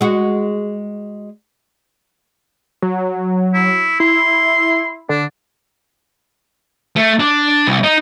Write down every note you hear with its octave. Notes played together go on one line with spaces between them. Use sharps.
G#3 F#4
F#3
E4
E4 C6
D3 D4
A3
D4
C2
D#4